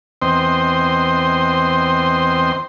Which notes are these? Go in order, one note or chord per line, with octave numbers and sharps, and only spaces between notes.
E2 C4 C5 D#5 C6